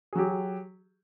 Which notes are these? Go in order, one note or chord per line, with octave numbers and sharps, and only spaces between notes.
F#3 G4 G#4